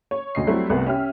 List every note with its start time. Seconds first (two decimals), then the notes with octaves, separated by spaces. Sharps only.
0.11 C#5
0.35 D2 D#5 C7
0.47 F#3 G3 A3 C4 E4
0.70 C2 A3 B3
0.87 C#4 G4 E5 F6